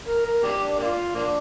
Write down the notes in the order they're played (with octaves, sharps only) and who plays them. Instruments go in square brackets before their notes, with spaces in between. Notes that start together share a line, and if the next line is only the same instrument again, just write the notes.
[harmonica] A#4
A#4
A#3 D4 G4
D4
A#3 D4 F4
F3 A#3 D4